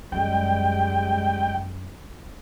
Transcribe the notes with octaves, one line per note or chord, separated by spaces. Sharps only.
F#2 G3 G#3 G5